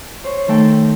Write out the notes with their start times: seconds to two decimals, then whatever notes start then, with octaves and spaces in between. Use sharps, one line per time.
0.24 C5 C#5
0.48 D#3 A3 A4 G5 C6 G6